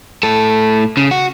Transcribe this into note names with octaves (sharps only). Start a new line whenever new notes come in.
A2 A4
C#3
F#4